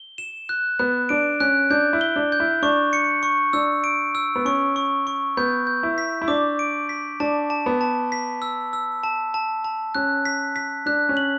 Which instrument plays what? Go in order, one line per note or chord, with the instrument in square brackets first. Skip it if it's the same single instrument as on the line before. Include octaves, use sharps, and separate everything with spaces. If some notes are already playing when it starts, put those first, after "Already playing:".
Already playing: [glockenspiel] G7
E7
F#6
[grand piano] B3 [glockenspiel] F#6
[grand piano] D4 [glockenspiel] D7
[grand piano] C#4 [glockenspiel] F#6
[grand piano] D4 [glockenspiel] G6
[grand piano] E4
[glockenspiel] G7
[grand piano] D4
[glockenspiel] G6
[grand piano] E4
[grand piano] D4 [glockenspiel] C#6
[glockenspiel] C#7
C#6
[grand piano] D4 [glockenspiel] E6
[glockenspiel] D7
E6
[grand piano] B3
[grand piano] C#4 [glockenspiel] C#6
[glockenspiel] C#6
C#6
[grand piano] B3 [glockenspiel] G6
[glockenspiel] G6
[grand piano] E4
[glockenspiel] B6
[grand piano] E4
[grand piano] D4 [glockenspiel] D6
[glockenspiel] D7
B6
[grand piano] D4 [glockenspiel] A5
[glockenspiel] A5
[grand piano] B3
[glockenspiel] A5
B6
E6
E6
A5
A5
A5
[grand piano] C#4 [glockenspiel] F#6
[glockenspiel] B6
B6
[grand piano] D4 [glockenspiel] F#6
[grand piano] C#4
[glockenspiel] F#7